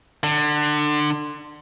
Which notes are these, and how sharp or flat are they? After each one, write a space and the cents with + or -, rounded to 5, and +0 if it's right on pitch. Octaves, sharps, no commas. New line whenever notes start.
D3 +25